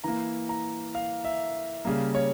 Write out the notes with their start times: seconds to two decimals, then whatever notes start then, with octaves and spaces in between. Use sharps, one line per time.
0.04 E3 A#3 A#5
0.49 A#5
0.95 F5
1.25 E5
1.85 C#3 G3 A#3
2.15 C#5